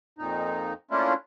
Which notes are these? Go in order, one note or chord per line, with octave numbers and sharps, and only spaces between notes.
F2 A#2 D#4
A3 A#3 C#4 D4 E4 F4